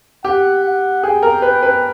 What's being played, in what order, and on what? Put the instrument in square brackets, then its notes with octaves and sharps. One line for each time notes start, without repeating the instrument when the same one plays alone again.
[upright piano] G4 [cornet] F#5
[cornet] F#5
[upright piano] G#4 [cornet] G5
[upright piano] A#4
B4
B4